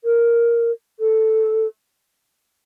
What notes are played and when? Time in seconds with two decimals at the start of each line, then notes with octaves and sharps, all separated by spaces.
0.04 A#4
1.00 A4